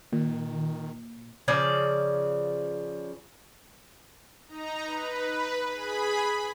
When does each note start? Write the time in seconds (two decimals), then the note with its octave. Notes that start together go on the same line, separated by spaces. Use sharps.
0.13 A#2 D#3
1.48 C#3 F3 D5
4.48 D#4 A#5
4.86 B4
5.66 G#4 B5